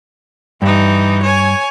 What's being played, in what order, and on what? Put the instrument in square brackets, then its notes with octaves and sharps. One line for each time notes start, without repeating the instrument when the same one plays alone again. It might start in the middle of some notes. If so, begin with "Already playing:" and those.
[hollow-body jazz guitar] G2 [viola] E3 D#4
[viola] C#5 G#5